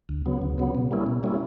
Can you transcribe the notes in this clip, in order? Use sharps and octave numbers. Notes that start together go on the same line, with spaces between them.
D2
C#3 F#3 B3
D2
C#3 F#3 B3
B2
G3 A#3 C#4 E4
B2
G3 A#3 C#4 E4